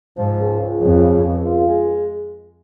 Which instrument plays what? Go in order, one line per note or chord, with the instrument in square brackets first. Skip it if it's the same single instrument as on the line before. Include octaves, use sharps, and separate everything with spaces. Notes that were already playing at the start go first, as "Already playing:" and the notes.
[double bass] G#2 [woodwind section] F3
[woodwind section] C#2
C#2
[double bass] F2 [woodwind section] C#3
[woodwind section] F3
C#2
F4
G#3